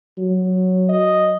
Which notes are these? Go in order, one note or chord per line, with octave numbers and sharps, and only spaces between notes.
F#3
D#5